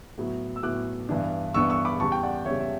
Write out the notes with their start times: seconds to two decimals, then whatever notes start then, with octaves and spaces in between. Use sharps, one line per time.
0.18 A2 F#3 B3 E4
0.56 E6
0.63 A2 F#3 B3 E4 D6 F#6
1.09 G2 E3 B3 D4
1.54 G2 E3 B3 D4 C#6 E6
1.70 C#6 E6
1.85 B5 D6
2.00 E2 C#3 G3 A5 C#6
2.12 G5
2.23 D5 F#5
2.46 E2 C#3 G3 C#5 E5
2.60 E5